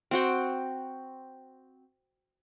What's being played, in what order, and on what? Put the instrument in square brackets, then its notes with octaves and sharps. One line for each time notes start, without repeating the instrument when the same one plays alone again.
[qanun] C4 F#4 G5